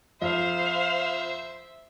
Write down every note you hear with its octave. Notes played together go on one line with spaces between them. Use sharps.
F2 C5 E5 F5